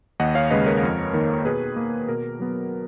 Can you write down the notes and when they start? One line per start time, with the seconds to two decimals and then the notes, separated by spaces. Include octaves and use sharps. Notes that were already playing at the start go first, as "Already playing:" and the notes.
0.20 D#2 D#5 F#5
0.35 C#5 F5
0.50 C#3 G#3 B4 D#5
0.66 A#4 C#5
0.83 F2
1.13 D#3 A#3
1.45 B2 G#4 B4
1.76 A#3
2.08 B2 A#4
2.39 F#3 B3